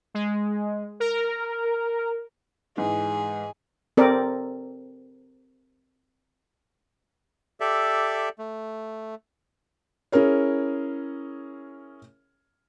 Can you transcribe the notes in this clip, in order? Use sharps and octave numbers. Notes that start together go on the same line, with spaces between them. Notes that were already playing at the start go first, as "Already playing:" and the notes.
G#3
A#4
G#2 E3 G#4
C4 A4 A#4 D5
G4 A4 D5 E5
A3
C#4 E4 G#4 A#4 C#5